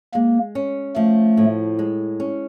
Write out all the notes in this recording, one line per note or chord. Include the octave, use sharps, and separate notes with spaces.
G#3 A#3
C#4
F3 A3
A2
G#3
C#4